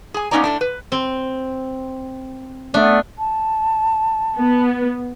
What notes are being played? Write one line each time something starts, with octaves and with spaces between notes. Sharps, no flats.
G#4 G#5
A#3 B3 C#4 D#4 D5 A#5
A2 A3 D4
B4
C4
A3 B3 D4
A5
B3